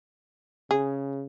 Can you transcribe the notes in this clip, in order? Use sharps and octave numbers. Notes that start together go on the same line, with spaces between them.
C#3 G#4